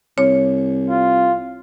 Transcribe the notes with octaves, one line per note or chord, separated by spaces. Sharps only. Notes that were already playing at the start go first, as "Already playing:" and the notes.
C2 C#5
F4